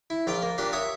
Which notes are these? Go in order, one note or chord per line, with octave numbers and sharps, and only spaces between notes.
E4
A#1 F4 F5 G5
A#3
A#2 D4 G4 F5
C#5 E5 D#6